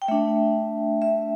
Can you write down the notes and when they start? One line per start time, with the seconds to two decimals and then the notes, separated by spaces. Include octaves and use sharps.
0.02 G5
0.08 A3 D4 E5
1.02 E5